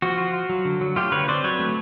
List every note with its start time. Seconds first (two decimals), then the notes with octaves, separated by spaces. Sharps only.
0.02 F3 F#4
0.18 F4
0.33 F4
0.49 F#3
0.65 D3
0.81 F#3
0.96 A3 F4 G4
1.12 D3 B4 C#5
1.28 C4 C5 D5
1.44 F#3 B4 C#5
1.59 A3